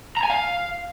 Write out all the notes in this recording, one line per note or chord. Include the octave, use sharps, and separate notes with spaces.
A#5
G#5
F5